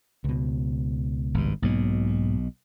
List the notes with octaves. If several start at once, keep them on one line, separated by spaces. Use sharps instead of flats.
C#2 B2
G#1 G2
B1 G#2 B2 A#3